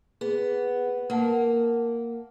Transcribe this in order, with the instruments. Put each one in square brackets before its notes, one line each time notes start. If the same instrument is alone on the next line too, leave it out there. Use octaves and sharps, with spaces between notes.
[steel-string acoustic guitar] B3 [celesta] G#4
[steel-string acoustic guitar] A#3 [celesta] A#4 F#5 A5